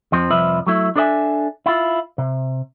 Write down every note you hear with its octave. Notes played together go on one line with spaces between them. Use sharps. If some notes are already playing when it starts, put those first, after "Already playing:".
F2 F3 C4
C2 F2 F3 B4 E5
F#3 A3 E4
D4 A4 A#4 D5 E5 G#5
E4 F4
C3